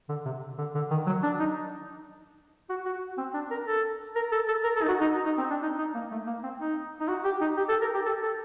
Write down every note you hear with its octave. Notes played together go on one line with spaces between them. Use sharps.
D3
C3
D3
D3
D#3
F#3
D4
D#4
F#4
F#4
C4
D4
A#4
A4
A#4
A4
A4
A#4
A4
D#4
F#4
D#4
D#4
C4
D4
D#4
D#4
A#3
A3
A#3
C4
D#4
D#4
F#4
G4
D#4
G4
A4
A#4
G4
A4
A4